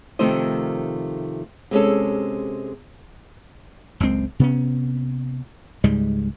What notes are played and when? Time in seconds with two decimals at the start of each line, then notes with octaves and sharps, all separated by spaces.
0.19 C3 D#3 F3 A3 C5 D#5
1.71 C3 G#3 C#4 A4
4.00 F#1 C#2 G#3 C4
4.39 C3 B3 C#4
5.84 C#2 G#2 G3 G#3